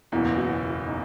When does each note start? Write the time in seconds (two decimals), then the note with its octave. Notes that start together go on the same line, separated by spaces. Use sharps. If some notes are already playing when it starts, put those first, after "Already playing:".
0.12 F#1 E2 B2 E4
0.37 F#4
0.87 D#4